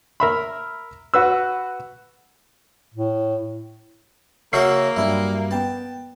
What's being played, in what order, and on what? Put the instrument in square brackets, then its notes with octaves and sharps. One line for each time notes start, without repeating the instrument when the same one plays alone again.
[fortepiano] A#4 E5 B5
F#4 B4 E6
[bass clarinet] A2
[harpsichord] C#3 F#4 E5 [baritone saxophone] A#3 [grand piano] C7
[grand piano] G2 F#3 G3 [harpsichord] E4
[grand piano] B3 G5 [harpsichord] A5